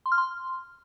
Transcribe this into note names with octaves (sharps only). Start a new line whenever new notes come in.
C6
F6
C6